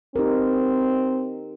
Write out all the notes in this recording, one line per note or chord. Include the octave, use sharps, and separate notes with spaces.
C4 D#4 G4 A#4